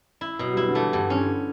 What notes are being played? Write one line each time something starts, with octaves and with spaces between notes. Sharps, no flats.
E4
B2 F#3
G3
F#3 E4
D3
E3 A3
G2 D3
D3 C#4